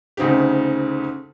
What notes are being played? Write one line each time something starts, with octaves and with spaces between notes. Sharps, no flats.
D2 C#3 C4 D#4 G4